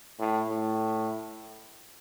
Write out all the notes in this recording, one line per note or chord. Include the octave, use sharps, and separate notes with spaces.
A2
A2